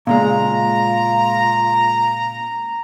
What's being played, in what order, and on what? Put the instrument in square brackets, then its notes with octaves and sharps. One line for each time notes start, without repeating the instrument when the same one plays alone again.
[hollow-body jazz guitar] A#2 C#3 G#3 [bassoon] F4 [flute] A#5